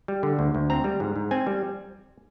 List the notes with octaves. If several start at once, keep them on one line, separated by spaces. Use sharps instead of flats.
G3
D3
D2
D2
C4 A#5
G3
G#2
G#2
C4 G#5
G3